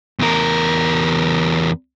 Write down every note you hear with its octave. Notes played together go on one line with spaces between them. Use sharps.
E2 A#4